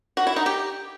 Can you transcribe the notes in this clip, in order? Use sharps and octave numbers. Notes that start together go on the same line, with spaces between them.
F#4
E4
D#4
G4